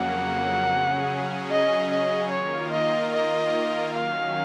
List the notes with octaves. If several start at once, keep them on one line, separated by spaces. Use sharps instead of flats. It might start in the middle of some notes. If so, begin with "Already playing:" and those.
Already playing: F2 C#3 F#3 A#3 F#5
C#3 F#3 C#4 G#4
D#5
D#5
D#3 A#3 F4 A#4 C#5
D#5
D#5
D#3 F#3 C#4 F5